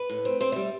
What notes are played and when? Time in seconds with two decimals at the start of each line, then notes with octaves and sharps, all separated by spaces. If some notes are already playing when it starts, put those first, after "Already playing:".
Already playing: B4
0.10 A2
0.25 C4
0.41 C4 C5
0.52 G3 E5